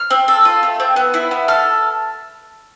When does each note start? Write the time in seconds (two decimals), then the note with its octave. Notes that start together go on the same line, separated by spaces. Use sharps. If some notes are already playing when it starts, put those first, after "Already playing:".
Already playing: F6
0.11 C4
0.28 A4
0.45 F4
0.63 A3
0.80 C4
0.96 B3
1.14 E4
1.31 B3
1.48 A4 F6